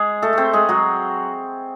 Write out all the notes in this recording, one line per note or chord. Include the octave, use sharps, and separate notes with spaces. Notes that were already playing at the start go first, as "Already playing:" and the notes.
Already playing: G#3 G#4
A3 A4
C4 A4 C5
G#3 G#4
F#3 F#4